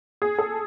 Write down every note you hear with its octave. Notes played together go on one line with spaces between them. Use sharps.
G#4
A4